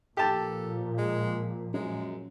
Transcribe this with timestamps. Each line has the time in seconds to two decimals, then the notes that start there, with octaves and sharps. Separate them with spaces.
0.17 A#2 F3 G4 A4 A5
0.98 G#3
1.74 F#2 G#3